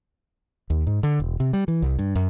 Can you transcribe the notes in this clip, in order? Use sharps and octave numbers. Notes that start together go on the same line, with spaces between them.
D#2
G#2
D3
E1
C3
G3
E3
C2
G2
F#2